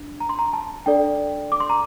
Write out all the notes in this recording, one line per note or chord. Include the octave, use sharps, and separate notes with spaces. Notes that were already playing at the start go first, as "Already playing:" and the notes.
Already playing: D4
A#5
C6
A#5
A5
D4 A4 D5 G5
D6
C6
A#5